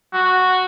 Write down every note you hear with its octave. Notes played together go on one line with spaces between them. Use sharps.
F#4